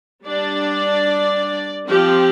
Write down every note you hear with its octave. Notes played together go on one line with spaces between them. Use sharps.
G3 D4 D5
F3 C4 G4